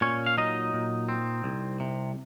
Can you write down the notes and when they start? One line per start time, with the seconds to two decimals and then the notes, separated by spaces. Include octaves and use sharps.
0.01 A#2 C#4 C#5
0.26 F5
0.37 F#3 D#4 D#5
0.73 A#2
1.09 C4
1.44 C2
1.80 C3